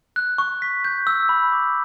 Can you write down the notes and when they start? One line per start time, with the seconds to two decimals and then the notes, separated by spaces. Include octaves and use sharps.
0.16 F#6
0.38 C#6
0.62 B6
0.85 G6
1.07 E6
1.29 B5
1.52 D6